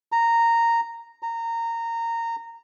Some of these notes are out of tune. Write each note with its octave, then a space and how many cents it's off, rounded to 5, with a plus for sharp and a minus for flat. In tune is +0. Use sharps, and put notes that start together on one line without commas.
A#5 -10
A#5 -20